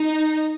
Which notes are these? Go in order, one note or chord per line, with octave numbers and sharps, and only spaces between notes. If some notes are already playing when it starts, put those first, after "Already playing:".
Already playing: D#4